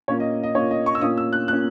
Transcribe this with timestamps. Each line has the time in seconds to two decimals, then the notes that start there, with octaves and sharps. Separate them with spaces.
0.08 A#2 A#3 C#4 C#5
0.20 D#5
0.43 D#5
0.55 A#2 A#3 C#4 C#5
0.71 D#5
0.86 C#6
0.95 E6
1.01 A#2 A#3 C#4 D#6
1.17 E6
1.33 F#6
1.48 A#2 A#3 C#4 F#6